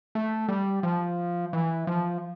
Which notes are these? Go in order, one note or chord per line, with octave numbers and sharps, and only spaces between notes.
A3
G3
F3
E3
F3